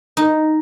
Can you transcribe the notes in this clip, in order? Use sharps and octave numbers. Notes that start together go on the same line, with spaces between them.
D#4